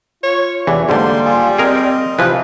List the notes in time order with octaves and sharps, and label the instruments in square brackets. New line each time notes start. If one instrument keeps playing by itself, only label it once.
[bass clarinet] F4 [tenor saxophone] C#5
[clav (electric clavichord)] E2 E3 [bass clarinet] C3 [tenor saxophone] D4
[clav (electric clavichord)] G#2 D3 [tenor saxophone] G3 [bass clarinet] A#3 [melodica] C5 C6
[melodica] F4 G#4
[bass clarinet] C4 [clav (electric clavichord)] G#4 A#4 [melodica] D#5
[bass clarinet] C3 [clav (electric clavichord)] E3 F3 [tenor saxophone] B4